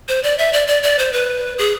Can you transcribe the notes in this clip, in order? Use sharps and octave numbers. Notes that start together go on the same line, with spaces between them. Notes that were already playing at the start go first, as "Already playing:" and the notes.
C5
D5
E5
D5
D5
D5
C5
B4
G#4